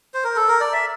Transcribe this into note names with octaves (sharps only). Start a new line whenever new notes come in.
C5
A#4
A4
A#4
D5
E5